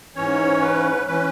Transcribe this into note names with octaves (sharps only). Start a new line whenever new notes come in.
G#2 E3 C#4 C#5
B4
E3 C#4 B4